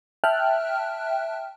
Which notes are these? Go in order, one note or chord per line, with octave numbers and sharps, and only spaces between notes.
E5 G5 A5 F6 F#6